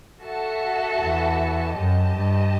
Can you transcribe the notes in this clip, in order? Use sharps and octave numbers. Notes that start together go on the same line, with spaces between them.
F#4 A4 E5 A5
E2
F#2 G4 D#5 A5
G2